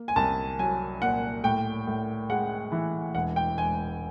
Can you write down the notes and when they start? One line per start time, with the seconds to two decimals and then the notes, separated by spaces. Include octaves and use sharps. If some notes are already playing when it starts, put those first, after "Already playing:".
Already playing: A#3
0.08 G#5
0.16 C2 A5
0.59 F#3 G#5
1.02 A#2 F#5
1.44 A2 G5
1.87 A2
2.30 G#3 F#5
2.72 E3
3.14 E1 F#5
3.36 G5
3.58 E1 G#5